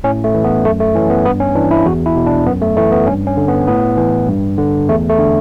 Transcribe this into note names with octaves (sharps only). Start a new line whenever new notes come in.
A2 C#4
A3
E3
B3
F#2 A3
A3
E3 C#4
B3
G2 B3
C#4
E3 D4
E4
E2 F#4
E4
B2
D4
F#2 B3
A3
E3 A3
B3
G2 C#4
C#4
D3
B3
A2 B3
E3
G2
D3
E2 A3
A3
D3